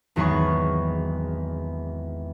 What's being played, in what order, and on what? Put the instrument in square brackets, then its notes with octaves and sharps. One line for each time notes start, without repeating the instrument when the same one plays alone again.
[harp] G#1 E2 F#3 G#4 B5 C#6